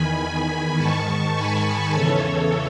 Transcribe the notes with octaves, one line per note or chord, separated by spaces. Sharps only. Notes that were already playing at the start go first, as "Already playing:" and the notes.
Already playing: E2 D#3 G#5 B5
G#2 D#3 A5 C#6
G#5 B5
E2 C#3 E3 A4 C#5